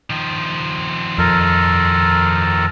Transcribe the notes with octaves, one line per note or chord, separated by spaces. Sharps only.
D#3 F3
F2 A4 A#4